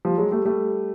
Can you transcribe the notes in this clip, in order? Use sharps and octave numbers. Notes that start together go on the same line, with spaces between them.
F3 G3
F#3 G#3
G3 A3
G3 A3